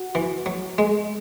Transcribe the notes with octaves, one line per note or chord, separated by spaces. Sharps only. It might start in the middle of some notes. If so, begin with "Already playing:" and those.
Already playing: F#4
E3
F#3
G#3